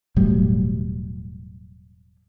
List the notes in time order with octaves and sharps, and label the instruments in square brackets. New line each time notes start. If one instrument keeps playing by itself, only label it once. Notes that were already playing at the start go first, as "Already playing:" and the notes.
[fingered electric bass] E1 A2 F#3 G3